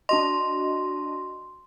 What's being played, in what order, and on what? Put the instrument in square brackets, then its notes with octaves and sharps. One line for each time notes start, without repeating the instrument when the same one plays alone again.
[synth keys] D4 F#4 D#5 [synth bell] C6